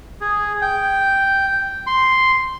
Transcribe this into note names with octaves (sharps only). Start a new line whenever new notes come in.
G#4
G5
C6